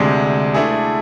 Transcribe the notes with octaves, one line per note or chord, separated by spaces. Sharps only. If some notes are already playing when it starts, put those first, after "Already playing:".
Already playing: D2 C3 G#3 D4
D3 A3 E4 G#4